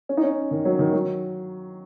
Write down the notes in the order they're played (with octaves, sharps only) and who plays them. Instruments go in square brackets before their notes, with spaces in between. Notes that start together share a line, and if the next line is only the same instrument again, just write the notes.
[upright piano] C#4
D#4
C#4
D#3
F#3
D#3
F#3